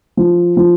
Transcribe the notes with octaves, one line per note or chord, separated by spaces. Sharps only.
F3
F3